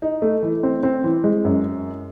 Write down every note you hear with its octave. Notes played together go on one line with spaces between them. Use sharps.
D#4
A3
E3
C4
C4
E3
G#3
F#2